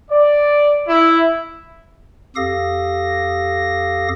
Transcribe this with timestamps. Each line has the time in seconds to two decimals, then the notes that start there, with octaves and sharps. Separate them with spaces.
0.11 D5
0.88 E4
2.36 F2 G4 A4 F5 D#6 A#6